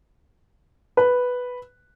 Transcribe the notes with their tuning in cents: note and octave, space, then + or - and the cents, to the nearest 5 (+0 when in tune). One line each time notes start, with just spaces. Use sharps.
B4 +0